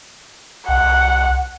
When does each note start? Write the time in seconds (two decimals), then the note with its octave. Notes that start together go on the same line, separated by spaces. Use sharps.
0.68 C2 F#5